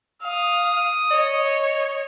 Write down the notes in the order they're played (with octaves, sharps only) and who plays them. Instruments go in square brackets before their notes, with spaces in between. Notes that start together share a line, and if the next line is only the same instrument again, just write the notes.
[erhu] F5 [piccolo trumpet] D#6
[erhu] C#5 [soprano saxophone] D#5